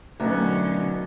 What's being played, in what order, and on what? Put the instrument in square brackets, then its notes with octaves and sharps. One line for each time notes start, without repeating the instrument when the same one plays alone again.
[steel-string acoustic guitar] D2 [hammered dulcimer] B2 D#3 D4 [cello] F#3 C#4